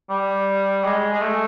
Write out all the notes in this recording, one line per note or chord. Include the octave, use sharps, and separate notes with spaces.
G3
G#3
G#3
A3